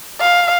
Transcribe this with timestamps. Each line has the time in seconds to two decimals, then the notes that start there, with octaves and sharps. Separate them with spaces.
0.20 F5